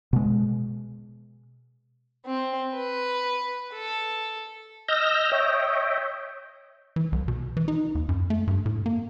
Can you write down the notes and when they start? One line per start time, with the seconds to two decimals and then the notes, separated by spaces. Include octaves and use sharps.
0.13 B2 G#3
2.26 C4
2.75 B4
3.74 A4
4.88 D#5 E6 F6 G6 A#6
5.32 C#5 D#5 E5 G5
6.96 E3
7.12 C2
7.28 B2
7.57 E3
7.68 D#4
7.95 D#2
8.09 F#2
8.30 A3
8.47 G2
8.66 A2
8.86 A#3